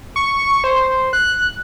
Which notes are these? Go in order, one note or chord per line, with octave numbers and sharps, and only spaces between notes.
C#6
C5
F#6